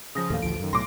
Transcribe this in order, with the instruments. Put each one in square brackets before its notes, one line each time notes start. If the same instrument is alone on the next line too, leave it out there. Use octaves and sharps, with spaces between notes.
[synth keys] C#3 F3 [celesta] D#6 A#6
[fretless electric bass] D#2 A2 [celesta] A4 F5
[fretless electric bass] A1 D2 F3 [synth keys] D7
[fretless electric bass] F#2 D#3
[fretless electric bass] B1 A2 [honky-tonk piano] C6 D6 [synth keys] A#6